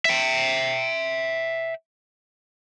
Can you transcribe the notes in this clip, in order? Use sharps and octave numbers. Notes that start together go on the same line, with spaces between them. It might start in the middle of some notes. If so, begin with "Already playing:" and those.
E5 G5